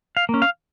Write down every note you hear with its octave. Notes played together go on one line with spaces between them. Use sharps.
F5
A#3 C#4
F5